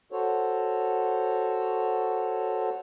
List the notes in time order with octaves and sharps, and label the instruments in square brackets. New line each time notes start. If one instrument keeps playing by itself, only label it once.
[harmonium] F#4 A4 C5 C#5